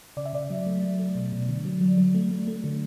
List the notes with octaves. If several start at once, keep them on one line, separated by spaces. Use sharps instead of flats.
C#3 D5
E5
C#3 D5
F#3
A3
F#3
A3
B2
B2
D3
F#3
F#3
F#3
A3
A3
A3
D3